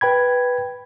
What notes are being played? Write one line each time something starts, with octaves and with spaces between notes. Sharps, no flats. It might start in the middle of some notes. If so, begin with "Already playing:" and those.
B4 G5 B5 G#6